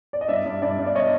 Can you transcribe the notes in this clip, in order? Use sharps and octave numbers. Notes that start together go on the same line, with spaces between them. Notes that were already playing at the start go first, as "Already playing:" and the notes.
D5
D#5
G2 D5 E5
G2
G2 D5 E5
G2
D5
C#5 D#5